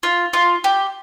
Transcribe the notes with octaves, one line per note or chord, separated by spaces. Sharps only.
F4
F4
G4